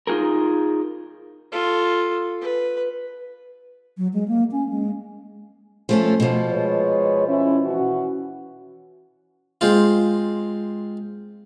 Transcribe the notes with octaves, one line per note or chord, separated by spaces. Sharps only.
D#4 F4 F#4 G#4 A#4
F4 A4
B4
F#3
G#3
A#3
C#4
G#3
F3 A3 C#4
B2 F3
G#3 B4 C#5
C#4 E4
E3 C#4 F#4
G#3 C4 F4